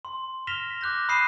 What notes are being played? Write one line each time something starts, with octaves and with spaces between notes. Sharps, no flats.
C6
F6 A#6 B6 E7 F7 G7
D6 F#6 G6 A#6
B5 D#6 F#6 C7 D#7 E7